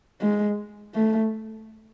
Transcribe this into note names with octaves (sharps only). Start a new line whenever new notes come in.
G#3
A3